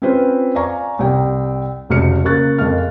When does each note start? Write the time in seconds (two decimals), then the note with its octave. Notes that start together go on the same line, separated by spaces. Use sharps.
0.02 C4 C#4 F4 B4 C5
0.55 D5 F5 G#5 A#5 C#6
0.99 C2 G5
1.89 F1 C#2 F#4 F6 C#7
2.25 C#3 A#3 C#6 F#6 A6
2.58 F2 G#3 A#4 F5 F6